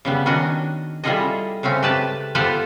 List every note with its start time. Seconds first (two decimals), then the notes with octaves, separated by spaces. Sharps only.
0.05 C#3 G3 B3
0.26 D#3 C#4 D4 F#4 D#5
1.04 G3 E4 F4 G#4 A4 D#5
1.63 C#3 A3 C4 C#4
1.83 G4 B4 A5
2.35 B3 F4 G4 A4 B4 C5